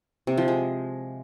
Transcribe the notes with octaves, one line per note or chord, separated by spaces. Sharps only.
C3
F3
G#3